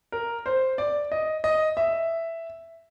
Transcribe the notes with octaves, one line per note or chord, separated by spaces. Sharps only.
A#4
C5
D5
D#5
D#5
E5